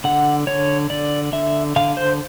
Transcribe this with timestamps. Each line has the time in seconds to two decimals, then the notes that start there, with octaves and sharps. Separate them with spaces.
0.04 D3 F#5
0.47 D3 C#5
0.90 D3 D5
1.33 D3 E5
1.76 D3 F5
1.97 C5